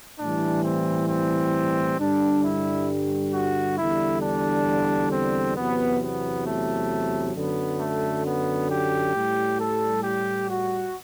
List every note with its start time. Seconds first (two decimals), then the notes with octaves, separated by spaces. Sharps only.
0.20 A2 E3 G3 D4
0.64 C4
1.09 C4
1.99 G2 D3 G3 D4
2.44 E4
3.34 F#4
3.78 E2 D3 G3 E4
4.22 D4
5.12 C4
5.57 E2 C3 F#3 B3
6.02 B3
6.47 A3
7.35 F#2 D3 F#3 B3
7.80 A3
8.26 B3
8.70 G4
9.15 A2 G3
9.60 A4
10.04 G4
10.49 F#4